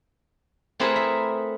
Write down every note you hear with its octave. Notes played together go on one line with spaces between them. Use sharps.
A3 C4 E4 G#4 A#4 B4
E5